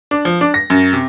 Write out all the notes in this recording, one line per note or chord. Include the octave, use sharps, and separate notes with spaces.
D4
F3
D4
A#6
F#2
C3